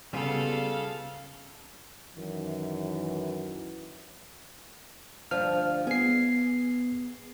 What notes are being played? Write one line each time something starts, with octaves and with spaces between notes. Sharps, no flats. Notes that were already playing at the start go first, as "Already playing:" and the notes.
C#3 G3 B3 F4 A4 F5
F#2 D#3 E3
D2 G2 F3 F6
B3 G#4 C7